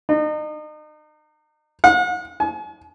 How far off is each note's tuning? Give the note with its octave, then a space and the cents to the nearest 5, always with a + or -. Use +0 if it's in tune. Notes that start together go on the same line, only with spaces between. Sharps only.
D#4 -35
F#5 -40
G#5 +40